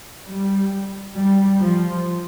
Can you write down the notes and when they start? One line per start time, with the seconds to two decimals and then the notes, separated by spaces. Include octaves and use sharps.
0.27 G3
1.16 G3
1.60 F3